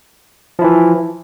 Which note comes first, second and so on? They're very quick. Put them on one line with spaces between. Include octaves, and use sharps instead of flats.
F3 E4 E3